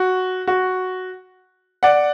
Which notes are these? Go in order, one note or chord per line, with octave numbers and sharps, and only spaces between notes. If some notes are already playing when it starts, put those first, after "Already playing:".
Already playing: F#4
F#4
D5 F#5